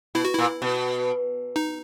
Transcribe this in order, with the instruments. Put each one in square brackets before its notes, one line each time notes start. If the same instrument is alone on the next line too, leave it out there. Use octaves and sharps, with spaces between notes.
[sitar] B2 [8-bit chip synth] E4
[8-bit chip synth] F#4
[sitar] A#2 [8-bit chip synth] E4
[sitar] B2
[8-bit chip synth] D#4